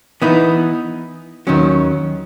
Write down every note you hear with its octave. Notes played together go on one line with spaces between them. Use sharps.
E3 B3 D#4
D#2 D#3 F#3 C#4